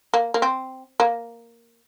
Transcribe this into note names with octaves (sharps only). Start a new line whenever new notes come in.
A#3
A#3
C4
A#3